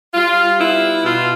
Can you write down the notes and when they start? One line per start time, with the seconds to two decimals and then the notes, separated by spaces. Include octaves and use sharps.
0.13 G3 F4
0.57 B3 E4
1.02 B2 F4